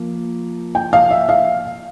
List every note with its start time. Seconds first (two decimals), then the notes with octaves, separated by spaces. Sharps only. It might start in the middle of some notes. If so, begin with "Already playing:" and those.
Already playing: F3 A#3
0.75 G5
0.93 F5
1.11 E5
1.29 F5